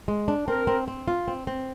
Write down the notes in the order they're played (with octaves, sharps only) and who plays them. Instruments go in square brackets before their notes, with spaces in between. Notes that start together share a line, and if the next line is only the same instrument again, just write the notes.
[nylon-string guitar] G#3
D4
[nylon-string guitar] C4 [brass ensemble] A#4
[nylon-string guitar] C4
C4
F4
C4
C4